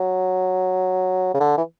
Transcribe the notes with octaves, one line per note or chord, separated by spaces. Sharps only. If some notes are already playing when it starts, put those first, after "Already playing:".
Already playing: F#3
C#3
D3
E3